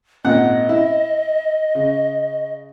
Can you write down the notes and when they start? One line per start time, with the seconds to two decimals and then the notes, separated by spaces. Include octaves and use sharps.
0.25 G#1 A#2 D#5 F#5
0.69 E4
1.75 C#3